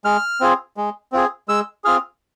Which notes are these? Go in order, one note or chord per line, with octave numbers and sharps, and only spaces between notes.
G#3 F6
C4 F4 G#4
G#3
C4 F4 G#4
G#3 E6
C4 F4 G#4 F6